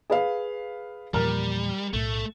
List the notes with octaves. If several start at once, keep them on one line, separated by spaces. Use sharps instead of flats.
G#4 B4 F5
E2 A#2 F3 G3 A#4 A#5 F6
B1 A2 A3